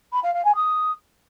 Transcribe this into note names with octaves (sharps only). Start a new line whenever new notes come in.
B5
F5
F5
G#5
D#6